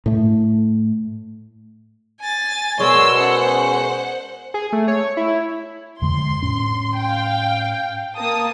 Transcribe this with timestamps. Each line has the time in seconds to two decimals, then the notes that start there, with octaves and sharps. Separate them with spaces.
0.06 A2 A3
2.20 G#5 A6
2.80 B2 G#3 G#4 A#4 C#5 D5 C6 E6
3.17 C#4 C5 F#5
4.54 G#4
4.73 A3
4.88 C#5
5.17 E4
6.02 F2 D3 G#3 C6
6.43 A2 C#4
6.98 F5 G5
8.17 A#3 A5 D#6